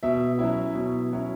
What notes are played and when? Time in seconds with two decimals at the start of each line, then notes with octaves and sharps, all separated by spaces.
0.03 B2 E5
0.39 F#3 C#4 E4
0.75 B2
1.12 F#3 C#4 E4